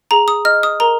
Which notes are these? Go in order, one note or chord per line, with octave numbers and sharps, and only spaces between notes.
G#4 A#5
D#6
D#5 F6
D#6
A#4 A#5